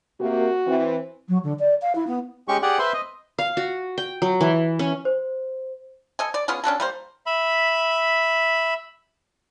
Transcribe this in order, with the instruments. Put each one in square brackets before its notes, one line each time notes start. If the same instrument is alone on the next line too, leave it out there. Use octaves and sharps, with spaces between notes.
[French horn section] C3 A#3 [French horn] F#4
[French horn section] E3 C4
[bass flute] F#3
D3
D5
F5
E4
B3
[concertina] G#3 C#4 G4 C#6
G4 G#4 D5 F#5
B4 C5 E5 C6
D#5
[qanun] F5
F#4
G5
F#3
E3
C#4
[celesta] C5
[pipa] A4 D#5 G#5
D5
B3 C#4 F4 G#4
C#4 D4 F#4 A4
G3 A#3 C5
[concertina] E5 B5